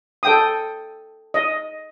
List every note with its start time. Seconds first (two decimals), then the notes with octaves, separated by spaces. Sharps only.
0.23 A4 G5 D#6
1.34 D#5